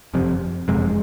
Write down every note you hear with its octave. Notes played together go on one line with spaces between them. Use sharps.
F#1 F2 C3
F#1 F2 C3 G#3